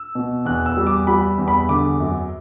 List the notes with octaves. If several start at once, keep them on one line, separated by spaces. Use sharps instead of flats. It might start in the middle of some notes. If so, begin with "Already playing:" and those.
Already playing: E6
B2
E2 F#6
E6
G3
D6
G3 B5
E2
B5
D3 D6
F#2